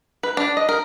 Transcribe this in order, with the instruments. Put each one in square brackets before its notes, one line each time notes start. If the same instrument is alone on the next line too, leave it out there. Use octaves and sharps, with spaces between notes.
[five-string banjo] B4
D4
D#5
A#4